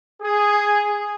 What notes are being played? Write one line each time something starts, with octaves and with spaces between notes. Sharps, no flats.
G#4